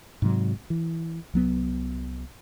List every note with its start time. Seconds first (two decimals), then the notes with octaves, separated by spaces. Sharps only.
0.22 G#2 C3 F#3
0.70 E3
1.34 C2 F#3 B3